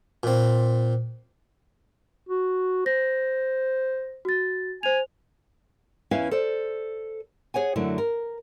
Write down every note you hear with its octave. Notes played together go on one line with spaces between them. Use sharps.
A#2 C4
F#4
C5 A#6
F#4 A6
C5 G#5 F7
E2 C#4 E4 B4 E5 F5
A4 C5 D5
G#4 C#5 F#5 G#5
F#2 D3 F#3 A3 E4
A#4